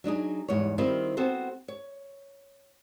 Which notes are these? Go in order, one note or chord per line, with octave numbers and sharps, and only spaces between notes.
F#3 D4 D#4 G#4
E2 G#2 G3 C#5
D#3 G3 C4 E4 F4
B3 C4 F#4 A4 C5
C#5